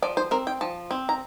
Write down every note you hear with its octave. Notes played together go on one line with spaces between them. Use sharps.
F3 D5
C5
C4 A#4
G5
F3 A5
C4
A#5